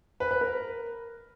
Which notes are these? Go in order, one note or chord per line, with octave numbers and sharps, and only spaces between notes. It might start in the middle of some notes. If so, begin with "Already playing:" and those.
B4
B4
A#4